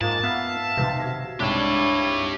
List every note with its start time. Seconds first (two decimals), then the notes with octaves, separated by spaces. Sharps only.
0.01 G#2 A#3 F4 A5
0.23 B3 E5 F5
0.77 B1 C3 D#3 B4
0.99 F#4 G#6 A#6
1.40 C2 G#2 D4 E4 G4 C#5 G5 A5